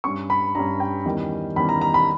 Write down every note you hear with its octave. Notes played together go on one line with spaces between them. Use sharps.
G2 G3 C#4 C#6
B5
G2 G3 C#4 A#5
G5
E2 D#3 G3 C#4
E2 D#3 G3 C#4 B5
A#5
A#5
B5